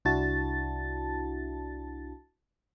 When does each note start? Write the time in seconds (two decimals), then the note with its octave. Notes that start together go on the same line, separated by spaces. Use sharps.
0.05 C2 D4 E4 F#4 A5 A6